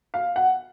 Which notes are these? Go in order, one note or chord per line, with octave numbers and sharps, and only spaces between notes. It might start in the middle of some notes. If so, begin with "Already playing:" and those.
F5
F#5